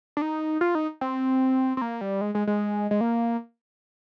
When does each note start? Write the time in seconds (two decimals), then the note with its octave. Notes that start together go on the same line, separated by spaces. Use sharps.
0.17 D4
0.22 D#4
0.61 F4
0.75 D#4
1.01 C4
1.77 C4
1.82 A#3
2.01 G3
2.21 G#3
2.35 G#3
2.47 G#3
2.91 G#3
3.01 A#3